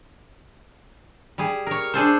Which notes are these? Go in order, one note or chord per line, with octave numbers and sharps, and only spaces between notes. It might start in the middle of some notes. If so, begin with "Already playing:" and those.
G3 G#4
A#4 C#5
D4 G#4 A4 C5